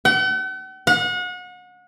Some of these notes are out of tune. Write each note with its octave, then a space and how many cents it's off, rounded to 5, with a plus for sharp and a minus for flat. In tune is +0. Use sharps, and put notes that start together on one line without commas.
F#5 +45
F#5 -35